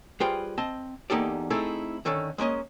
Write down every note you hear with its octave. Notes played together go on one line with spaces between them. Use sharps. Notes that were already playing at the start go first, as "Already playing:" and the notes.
G3 F4 G#4 B4 C5 G5
C4 D#5 A5
E2 A#3 D#4 G4 A4 D5
A3 C4 D#4 E4 G#4 A4
D3 D#3 C#4 A4
G#3 A#3 C#4 D#5